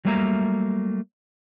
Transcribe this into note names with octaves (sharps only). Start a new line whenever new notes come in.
F#3 G3 A3 A#3 E5 A#5